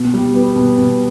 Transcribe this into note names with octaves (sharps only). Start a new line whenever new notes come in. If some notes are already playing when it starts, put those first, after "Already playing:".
Already playing: B2
G3
B3
B2
B2